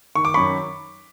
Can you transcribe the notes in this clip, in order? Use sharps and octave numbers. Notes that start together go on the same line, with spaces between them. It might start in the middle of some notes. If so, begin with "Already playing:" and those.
D#3 C#6
D6
F#2 B5 C#6